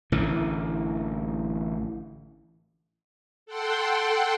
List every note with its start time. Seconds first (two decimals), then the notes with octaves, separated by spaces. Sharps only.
0.12 A1 D3 E3
3.46 A4 F#5 G5 C6